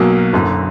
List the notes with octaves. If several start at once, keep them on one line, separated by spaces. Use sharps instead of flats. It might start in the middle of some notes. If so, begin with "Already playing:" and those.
Already playing: B1 B2 F#3 A#3
F#1 F#2 D3